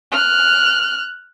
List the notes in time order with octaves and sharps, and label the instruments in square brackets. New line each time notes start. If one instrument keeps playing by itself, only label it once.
[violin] F6 F#6